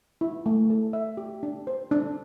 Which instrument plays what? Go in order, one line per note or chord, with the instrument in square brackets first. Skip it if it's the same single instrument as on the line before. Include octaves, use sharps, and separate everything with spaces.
[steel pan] E4
A3
A4
E5
G4
D4
C5
D4